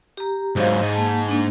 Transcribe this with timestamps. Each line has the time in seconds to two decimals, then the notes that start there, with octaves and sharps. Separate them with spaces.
0.17 G4 A#5
0.56 G#2 F#3 C5 D#5 F5
0.82 G#2 D#5
0.94 A#3 A5
1.29 A#3 D4